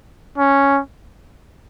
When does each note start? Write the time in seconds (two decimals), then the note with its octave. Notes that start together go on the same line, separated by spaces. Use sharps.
0.38 C#4